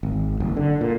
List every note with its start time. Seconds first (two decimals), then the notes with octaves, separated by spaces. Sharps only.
0.03 G#1
0.40 F#1
0.57 D3
0.81 A#2